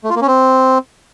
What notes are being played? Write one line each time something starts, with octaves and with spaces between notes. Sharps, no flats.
A3
F4
A#3
C#4
C4